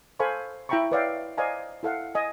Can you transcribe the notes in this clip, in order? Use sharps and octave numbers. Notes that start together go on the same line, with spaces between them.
A4 C5 F5 G#5 B5 C#6
E4 E5 G5 A#5 B5 C#6
B4 C#5 D5 E5 F5 G5
C5 D5 D#5 F5 G#5 A#5
E4 A4 F5 F#5
D#5 G#5